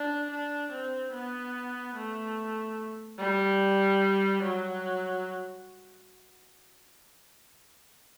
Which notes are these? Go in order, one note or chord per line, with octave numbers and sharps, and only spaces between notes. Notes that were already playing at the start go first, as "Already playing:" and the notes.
Already playing: D4
D4
C4
B3
A3
G3
F#3